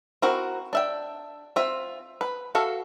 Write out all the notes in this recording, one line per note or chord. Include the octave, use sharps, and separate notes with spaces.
C4 E4 F#4 A#4
D4 E5 G5
C4 F4 E5
B4
F#4 A4 E5 F5